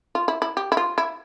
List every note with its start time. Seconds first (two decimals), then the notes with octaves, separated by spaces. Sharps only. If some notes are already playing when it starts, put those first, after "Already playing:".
0.15 F4
0.28 E4
0.42 E4
0.57 G4
0.72 E4
0.77 F4
0.98 E4